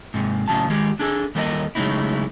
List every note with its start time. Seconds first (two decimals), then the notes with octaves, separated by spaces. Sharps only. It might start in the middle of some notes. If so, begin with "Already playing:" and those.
0.14 G#2 C3
0.48 A2 C#3 F#3 A5
0.68 D#3 G#3 G4
0.99 D4 G#4 A4
1.35 D#2 G3 A4 A#4 D#5
1.75 C#3 F#3 G#3 A3 D#4 E4